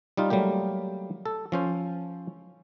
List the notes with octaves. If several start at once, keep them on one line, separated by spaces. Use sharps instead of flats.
G3 D#4 F4
F#3 G3 A3 A#3 G4
A4
F3 C#4 C5